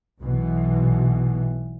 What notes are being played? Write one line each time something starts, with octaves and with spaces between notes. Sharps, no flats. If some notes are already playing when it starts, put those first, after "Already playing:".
B1 B2 E3